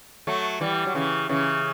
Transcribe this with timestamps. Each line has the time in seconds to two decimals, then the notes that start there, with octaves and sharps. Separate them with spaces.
0.27 F#3 A3
0.61 E3 G3
0.86 F#3
0.95 C#3 E3
1.29 C#3 E3